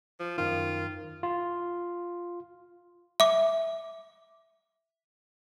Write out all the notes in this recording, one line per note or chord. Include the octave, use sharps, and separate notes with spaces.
F3
F#2 D#3 F4
F4
E5 D6